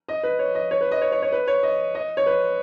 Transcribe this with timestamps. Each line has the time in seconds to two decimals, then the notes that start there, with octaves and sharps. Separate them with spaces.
0.08 D#5
0.23 B4
0.39 C#5
0.55 D#5
0.71 C#5
0.81 B4
0.91 D#5
1.01 C#5
1.12 C#5
1.22 C#5
1.32 B4
1.48 C#5
1.63 D#5
1.95 D#5
2.17 C#5
2.26 B4